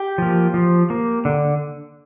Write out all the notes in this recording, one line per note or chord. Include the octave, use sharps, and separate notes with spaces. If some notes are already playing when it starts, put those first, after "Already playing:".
Already playing: G4
F3 A#3
F3
A#3
D3